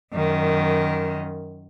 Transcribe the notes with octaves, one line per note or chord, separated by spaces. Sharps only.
F#2 D#3